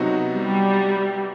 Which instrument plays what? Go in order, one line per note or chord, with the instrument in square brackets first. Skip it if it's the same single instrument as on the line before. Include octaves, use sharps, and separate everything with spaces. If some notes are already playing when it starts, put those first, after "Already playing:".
Already playing: [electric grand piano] C3 F#3 B3 D#4 F#4
[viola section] G3